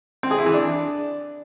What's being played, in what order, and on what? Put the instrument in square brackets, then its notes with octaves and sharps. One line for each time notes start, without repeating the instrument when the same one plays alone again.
[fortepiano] C4
G#4
E4
E3
D4